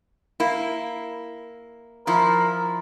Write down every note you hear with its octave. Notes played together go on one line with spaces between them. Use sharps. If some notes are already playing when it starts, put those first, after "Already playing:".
A#3 E4
F3 E4 A#4